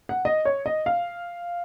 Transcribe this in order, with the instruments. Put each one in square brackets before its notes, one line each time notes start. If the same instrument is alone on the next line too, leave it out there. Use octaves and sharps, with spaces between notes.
[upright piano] F#5
D#5
C#5
D#5
F5